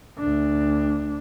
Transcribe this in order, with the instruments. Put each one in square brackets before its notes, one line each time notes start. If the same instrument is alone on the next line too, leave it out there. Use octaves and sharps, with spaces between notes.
[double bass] D2 D4